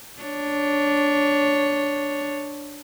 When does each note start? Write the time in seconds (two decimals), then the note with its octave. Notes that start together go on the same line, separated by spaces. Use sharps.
0.21 D4 C#5